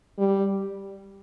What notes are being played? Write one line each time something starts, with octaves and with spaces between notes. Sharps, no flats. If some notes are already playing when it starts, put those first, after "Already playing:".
G3